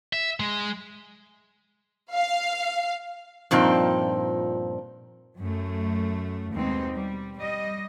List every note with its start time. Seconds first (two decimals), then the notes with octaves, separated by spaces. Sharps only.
0.13 E5
0.40 G#3
2.14 F5
3.51 G2 A#2 F3 C4 D#4
5.38 F#2 A3
6.52 D#2 B2 G#3 C4 D#4
6.93 G3
7.38 G3 D#5